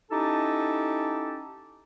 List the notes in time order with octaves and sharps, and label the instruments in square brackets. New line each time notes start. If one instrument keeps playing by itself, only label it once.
[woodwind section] C#4 D#4 E4 G4 A4 A5